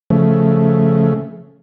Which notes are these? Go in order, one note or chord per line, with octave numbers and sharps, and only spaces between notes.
C#3 F3 A3